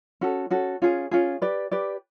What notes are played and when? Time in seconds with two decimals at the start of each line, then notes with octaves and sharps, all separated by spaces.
0.21 C#4 F#4 A4
0.50 C#4 F#4 A4
0.82 C#4 F4 G#4
1.11 C#4 F4 G#4
1.42 G4 B4 D5
1.71 G4 B4 D5